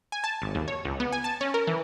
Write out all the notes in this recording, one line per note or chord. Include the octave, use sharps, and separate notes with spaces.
G#5
A5
G#1
D#2
C#5
C#2
B3
G#5
A5
C#4
A#4
E3